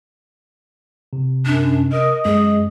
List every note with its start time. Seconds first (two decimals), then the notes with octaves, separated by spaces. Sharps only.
1.13 C3
1.46 F#2 D4
1.92 A#4 D#5
2.25 F#2 G#3 G#4